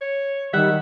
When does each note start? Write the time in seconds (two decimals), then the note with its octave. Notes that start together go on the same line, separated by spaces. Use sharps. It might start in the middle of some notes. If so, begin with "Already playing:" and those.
0.01 C#5
0.54 D#3 G3 E5 F#5